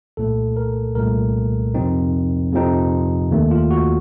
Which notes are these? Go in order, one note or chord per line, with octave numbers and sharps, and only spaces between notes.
C2 A#2 A3 A4
A#4
C2 A#2 A3 A#4
F2 C3 F3 C4 D#4
F2 C3 F3 C4 D#4
D#2 D#3 A3
F4
F#4